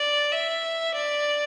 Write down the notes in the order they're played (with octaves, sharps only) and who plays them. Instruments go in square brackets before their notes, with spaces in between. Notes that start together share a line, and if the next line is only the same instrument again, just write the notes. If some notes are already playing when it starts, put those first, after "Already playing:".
Already playing: [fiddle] D5
E5
D5